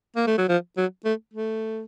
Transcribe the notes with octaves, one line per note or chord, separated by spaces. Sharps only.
A#3
A3
F#3
F3
F#3
A3
A3